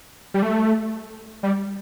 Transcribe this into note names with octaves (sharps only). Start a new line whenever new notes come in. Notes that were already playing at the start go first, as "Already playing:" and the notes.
G3
A3
G3